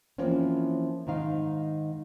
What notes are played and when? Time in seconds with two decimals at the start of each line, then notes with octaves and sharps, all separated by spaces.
0.18 E3 F3 A#3 C4 C#4
1.07 G#2 D#3 D#4 F5